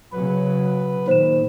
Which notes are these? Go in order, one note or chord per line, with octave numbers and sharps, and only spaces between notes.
C#3 F#3 B4
A#2 D#3 C5 E7